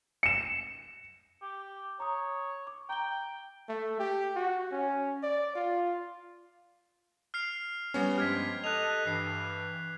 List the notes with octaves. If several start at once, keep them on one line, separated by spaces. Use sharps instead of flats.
C#7 E7
G4
C#5 A#5 D#6
D6
G5 A#5 G7
A3
G4
F#4
C#4
D5
F4
F6 C7 F7
G3 B3 C#4
G2 F3 G#3 G4 F6 G#6 B6
A4 D#5 F#6 F7
G2 E3 C7 F7